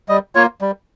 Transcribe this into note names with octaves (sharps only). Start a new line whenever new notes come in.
G3 D#5
A#3 F4 C#5
G3